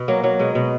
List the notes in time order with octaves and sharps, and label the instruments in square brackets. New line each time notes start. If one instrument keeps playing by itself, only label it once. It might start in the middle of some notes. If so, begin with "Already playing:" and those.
Already playing: [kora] B2
F#3 A#3
F#3
B2 G#3
B2